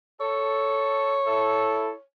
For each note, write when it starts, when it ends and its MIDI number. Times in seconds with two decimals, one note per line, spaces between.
0.20 1.19 69
0.20 2.02 73
1.26 1.91 64
1.26 1.91 69